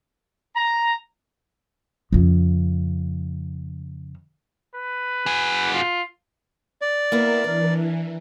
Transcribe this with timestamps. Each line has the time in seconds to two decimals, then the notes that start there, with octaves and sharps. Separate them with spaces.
0.56 A#5
2.12 F2 C#3
4.75 B4
5.26 F#4 G#4
5.73 F4
6.82 D5
7.12 A#3 B3 E4 A#4
7.44 E3 D4